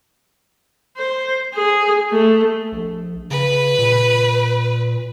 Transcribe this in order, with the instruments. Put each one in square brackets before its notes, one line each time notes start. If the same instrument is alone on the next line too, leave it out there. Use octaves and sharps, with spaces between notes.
[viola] C5
G#4
A3
[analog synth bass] A#1
[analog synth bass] C#3 [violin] B4
[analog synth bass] A#2